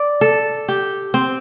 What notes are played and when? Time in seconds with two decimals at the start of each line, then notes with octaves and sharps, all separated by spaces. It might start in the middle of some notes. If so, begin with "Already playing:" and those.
Already playing: D5
0.21 A4
0.68 G4
1.14 C4